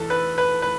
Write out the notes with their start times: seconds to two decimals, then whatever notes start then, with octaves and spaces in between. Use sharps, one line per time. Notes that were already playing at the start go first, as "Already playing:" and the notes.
Already playing: E2 A4
0.10 B4
0.38 B4
0.62 B4